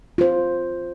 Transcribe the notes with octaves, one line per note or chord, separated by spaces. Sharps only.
F4 C5